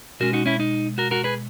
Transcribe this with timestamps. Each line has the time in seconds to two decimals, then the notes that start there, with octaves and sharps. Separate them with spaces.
0.20 B2 G#3 C#4 F#4 A#4
0.33 D#4 F#4
0.46 C#4 E4
0.60 D#4
0.98 F#4 A#4
1.11 F#4 A#4
1.24 G#4 B4